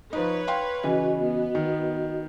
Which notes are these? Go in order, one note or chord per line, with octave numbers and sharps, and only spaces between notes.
F3 D#4 B4 C#5
F5 G5 C6
C#3 E3 F#4 D#5
B3
D#3